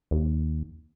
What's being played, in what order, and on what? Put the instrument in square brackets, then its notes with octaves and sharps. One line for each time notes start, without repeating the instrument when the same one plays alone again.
[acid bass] D#2